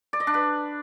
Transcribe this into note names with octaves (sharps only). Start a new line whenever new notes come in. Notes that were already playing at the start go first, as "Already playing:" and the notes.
D5
D#5
D4
B4